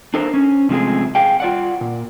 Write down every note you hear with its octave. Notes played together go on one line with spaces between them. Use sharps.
D4 A4 A#4 C5
C#4
C3 F3 G#3 A3 G#4
G#4 F5 G5
F4 D5 F#5
A#2